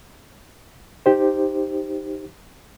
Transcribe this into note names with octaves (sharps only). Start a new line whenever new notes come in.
D#4 G4 C5